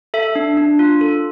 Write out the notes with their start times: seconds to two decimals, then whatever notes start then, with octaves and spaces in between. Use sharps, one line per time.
0.14 A4 E5
0.35 D4
0.57 D4
0.79 F4
1.01 A4